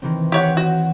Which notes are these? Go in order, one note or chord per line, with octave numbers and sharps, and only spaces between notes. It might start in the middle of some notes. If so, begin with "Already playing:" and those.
D#3 E3 C4
G4 C#5 F#5
F#4